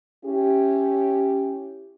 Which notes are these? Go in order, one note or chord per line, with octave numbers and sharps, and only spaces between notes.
C#4 E4 G4